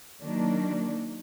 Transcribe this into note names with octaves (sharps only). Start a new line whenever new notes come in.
D#3 F#3 A#3 D4